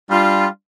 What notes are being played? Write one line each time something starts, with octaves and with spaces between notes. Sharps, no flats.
G3 D4 F4